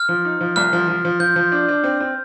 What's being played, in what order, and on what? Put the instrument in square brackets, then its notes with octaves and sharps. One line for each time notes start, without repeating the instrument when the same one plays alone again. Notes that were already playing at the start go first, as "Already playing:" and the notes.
Already playing: [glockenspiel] F6
[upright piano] F3
D#4
F3
[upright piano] C2 [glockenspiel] F6
[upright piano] F3
F3
F3
[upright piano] F3 [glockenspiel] G6
[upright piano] F3
D4
D4
C4
C4